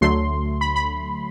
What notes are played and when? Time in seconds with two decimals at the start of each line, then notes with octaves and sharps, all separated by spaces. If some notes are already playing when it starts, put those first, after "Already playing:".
0.01 D2 D3 F#3 A3 C6
0.61 B5
0.76 B5